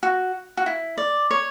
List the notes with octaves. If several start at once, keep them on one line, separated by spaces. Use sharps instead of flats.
F#4
F#4
E4
D5
C#5